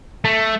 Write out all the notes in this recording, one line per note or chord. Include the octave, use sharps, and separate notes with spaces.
A3